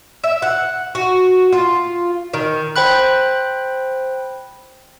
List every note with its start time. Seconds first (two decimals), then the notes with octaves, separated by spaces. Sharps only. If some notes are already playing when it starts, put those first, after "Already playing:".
0.24 E5
0.42 F#5
0.95 F#4
1.53 F4
2.34 D#3
2.76 C5 G5 B5 F#6